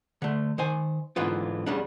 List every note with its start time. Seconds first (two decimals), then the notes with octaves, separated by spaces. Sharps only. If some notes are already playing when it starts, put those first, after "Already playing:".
0.22 D3 A3
0.58 D#3 C5 G#5
1.16 G#2 D3 E3 B3 F4
1.66 E2 C#3 G3 D4